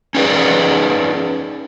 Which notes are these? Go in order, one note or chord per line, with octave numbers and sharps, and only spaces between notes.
C#4 D#4 G#4 B4 D5